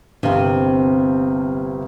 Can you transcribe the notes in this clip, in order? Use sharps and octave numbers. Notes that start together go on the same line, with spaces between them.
G1 C2 C3 C4 F5